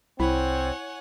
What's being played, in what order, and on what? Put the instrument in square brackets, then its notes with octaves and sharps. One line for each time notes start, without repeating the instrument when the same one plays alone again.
[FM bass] C2 [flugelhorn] C4 [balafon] E4 [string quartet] C#5 F#5 G#5